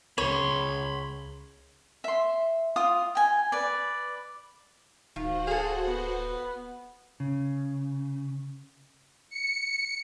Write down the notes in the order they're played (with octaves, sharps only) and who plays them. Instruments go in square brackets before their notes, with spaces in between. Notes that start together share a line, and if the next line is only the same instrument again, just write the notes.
[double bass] C#2 [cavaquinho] C#5 [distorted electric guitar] B5 C6
[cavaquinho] E5 C6
F4 F5 D6 D#6
G5 G#5
B4 D5
[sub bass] D1 [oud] D#3 F4 [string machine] F#4 C5 F#5
[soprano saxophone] G#4 [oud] A4 F5
[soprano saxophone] B3
[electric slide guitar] C#3
[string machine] C#7